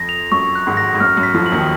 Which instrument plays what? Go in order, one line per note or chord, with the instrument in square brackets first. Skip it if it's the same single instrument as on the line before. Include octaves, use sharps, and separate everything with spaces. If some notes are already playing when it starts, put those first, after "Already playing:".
Already playing: [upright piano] F2 [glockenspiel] A#6
[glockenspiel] F7
[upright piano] F#2 [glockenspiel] C#6
[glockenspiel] F#6
[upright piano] G#1 G#2
[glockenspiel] A#6
[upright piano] G#2
[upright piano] F#2 [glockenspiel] F6
[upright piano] F#2
[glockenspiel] B6
[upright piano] F2 F3
[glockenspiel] F#7
[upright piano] D#2 D#3